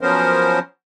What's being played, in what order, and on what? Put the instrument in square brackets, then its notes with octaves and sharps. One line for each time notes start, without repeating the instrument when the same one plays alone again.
[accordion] F3 F#3 B3 C#4 A#4 C5